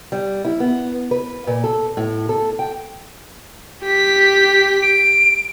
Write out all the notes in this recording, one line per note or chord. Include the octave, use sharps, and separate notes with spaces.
G3
E4
B3
B4
A#2
A4
A2
A4
G5
G4 B6
D7